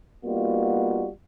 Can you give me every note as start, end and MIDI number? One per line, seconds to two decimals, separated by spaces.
0.25 1.07 55
0.25 1.07 58
0.25 1.07 59
0.25 1.07 63
0.25 1.07 65
0.25 1.07 66